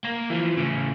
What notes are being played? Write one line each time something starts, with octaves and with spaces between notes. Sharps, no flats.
A#3
E3 F3
A2 C#3